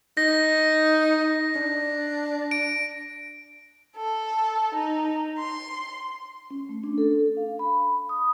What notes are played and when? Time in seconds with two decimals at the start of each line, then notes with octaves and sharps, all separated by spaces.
0.17 D#4 A#6
1.55 D4
2.51 D7
3.95 A4
4.73 D#4
5.37 C6
6.50 C#4
6.69 A3
6.84 D4
6.98 A4
7.37 F5
7.59 B5
8.09 D#6